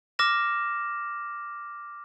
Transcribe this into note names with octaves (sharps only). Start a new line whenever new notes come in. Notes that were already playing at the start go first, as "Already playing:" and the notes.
D6 F6 A#6 E7